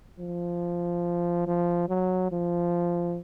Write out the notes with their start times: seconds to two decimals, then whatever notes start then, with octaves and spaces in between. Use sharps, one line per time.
0.19 F3
1.47 F3
1.89 F#3
2.32 F3